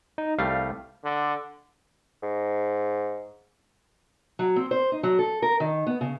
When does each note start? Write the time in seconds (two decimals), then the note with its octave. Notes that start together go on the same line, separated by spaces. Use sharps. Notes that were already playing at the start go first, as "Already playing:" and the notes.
0.18 D#4
0.39 C2 G3 A3 F5
1.05 D3
2.23 G#2
4.39 F#3
4.56 C4
4.71 C5
4.92 D#4
5.03 F#3
5.19 A4
5.42 A#4
5.60 D#3
5.87 B3
6.01 C#3